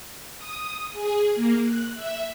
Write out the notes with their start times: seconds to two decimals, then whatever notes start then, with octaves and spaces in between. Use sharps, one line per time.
0.38 D#6
0.92 G#4
1.35 A#3
1.64 F#6
1.95 E5